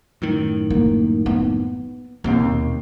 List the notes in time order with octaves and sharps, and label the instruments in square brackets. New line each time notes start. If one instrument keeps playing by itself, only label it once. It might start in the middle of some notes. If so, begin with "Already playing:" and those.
[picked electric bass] F#2 A2 D#3
[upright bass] A#3
B3
[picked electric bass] D#1 B2 C4 [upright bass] D#2